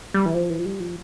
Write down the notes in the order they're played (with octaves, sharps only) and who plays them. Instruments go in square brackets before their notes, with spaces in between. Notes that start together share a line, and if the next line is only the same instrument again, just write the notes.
[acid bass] G3
E3
F3
E3
F3
G3
F3